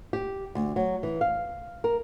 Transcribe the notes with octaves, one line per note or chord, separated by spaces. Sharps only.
G4
D2
F#3
E3
F5
A#4